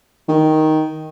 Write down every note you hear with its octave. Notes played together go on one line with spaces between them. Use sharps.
D#3